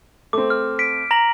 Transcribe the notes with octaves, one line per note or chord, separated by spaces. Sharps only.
A3 C4 D6
F6
B6 D7
A#5 A#6 F#7